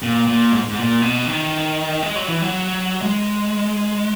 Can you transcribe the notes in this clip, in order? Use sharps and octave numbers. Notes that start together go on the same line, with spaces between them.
A#2
A#2
G#2
G#2
A#2
B2
D#3
G#3
F#3
E3
F#3
G#3